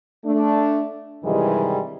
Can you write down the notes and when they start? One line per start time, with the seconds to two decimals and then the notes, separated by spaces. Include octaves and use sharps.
0.25 A3 D4
1.23 G2 C3 D#3 E3 G3 G#3